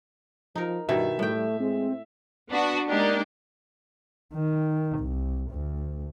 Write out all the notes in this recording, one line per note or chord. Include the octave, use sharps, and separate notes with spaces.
F3 D#4 A#4
G2 B2 D#3 E4 E5
A2 G3 A3 G5
G#3 C4
B3 D4 F#4
G#3 A#3 D4 D#4 G4 A#4
D#3
C2
D2